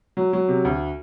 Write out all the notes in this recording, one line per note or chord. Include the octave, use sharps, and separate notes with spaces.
F#3
F#3
C3
D2